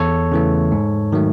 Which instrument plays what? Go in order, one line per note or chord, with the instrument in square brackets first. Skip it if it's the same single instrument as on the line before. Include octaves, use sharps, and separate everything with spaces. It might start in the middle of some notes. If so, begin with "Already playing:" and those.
Already playing: [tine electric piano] E2 A4 C#5
C#3 E3 A3
G#2
D#3 F#3 A3